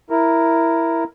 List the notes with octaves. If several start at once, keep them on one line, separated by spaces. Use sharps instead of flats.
E4 A#4